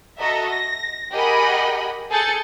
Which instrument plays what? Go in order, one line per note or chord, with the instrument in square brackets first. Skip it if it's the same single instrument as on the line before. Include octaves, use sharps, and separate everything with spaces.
[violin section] F#4 A4 D#5 E5 A#5
A#6
G4 G#4 A#4 D#5 F#5 B5
G#4 A4 G6 A6 C#7